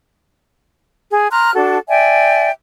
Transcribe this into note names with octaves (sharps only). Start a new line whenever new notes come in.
G#4
A#5 C6 F6 F#6
D4 F#4 A4
D5 E5 G5 G#5